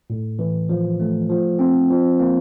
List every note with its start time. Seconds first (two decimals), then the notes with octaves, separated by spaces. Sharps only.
0.10 A2
0.39 E3
0.69 F3
1.00 A3
1.30 F3
1.59 C4
1.90 F3
2.20 A#3